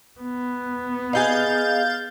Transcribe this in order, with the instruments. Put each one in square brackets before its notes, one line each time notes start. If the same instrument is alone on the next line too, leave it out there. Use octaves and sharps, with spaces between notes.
[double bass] B3
[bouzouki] D#4 E4 G#4 [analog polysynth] F5 G6 A6